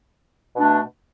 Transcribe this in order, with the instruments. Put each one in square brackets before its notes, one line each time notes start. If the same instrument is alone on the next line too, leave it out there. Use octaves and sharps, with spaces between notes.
[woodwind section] B2 A3 D4